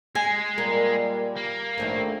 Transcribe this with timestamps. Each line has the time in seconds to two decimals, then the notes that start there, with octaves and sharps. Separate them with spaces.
0.15 G#3 G#5
0.58 A#2 G3 A#3 A#4
1.37 A#3
1.78 A#1 D#3 A3 C4 B4